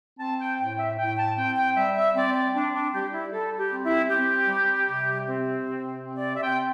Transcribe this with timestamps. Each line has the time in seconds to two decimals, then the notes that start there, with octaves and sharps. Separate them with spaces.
0.20 C4 A5
0.40 G5
0.59 A2 G5
0.78 E5
0.98 A2 G5
1.17 A5
1.37 C4 G5
1.56 G5
1.76 G3 E5
1.96 E5
2.15 C4 D5
2.34 D5
2.54 C4 D4
2.73 D4
2.93 G3 G4
3.13 E4
3.32 G3 A4
3.58 G4
3.71 C4
3.84 E4
4.09 C4 G4
4.48 G3
4.87 C3
5.27 C4
5.65 C3
6.04 C4
6.17 D5
6.36 E5
6.43 C4 G5